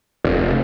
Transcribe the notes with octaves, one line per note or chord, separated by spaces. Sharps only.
F1